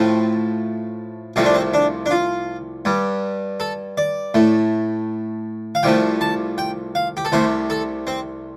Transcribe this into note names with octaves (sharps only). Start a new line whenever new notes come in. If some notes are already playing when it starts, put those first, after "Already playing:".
Already playing: A2 F3 A3 C4
C2 C3 F3 A3 C4
D4
C4
D4
D4
F4
G2 G3
A4
D5
A2 A3
F5
C2 C3 F3 A3 G5
A5
G5
F5
G4
A4
C2 C3 A3 C5
A4
C4